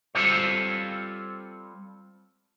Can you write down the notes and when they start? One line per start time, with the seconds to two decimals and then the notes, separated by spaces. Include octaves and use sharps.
0.15 G3 C4 F4 A4 C5 C#5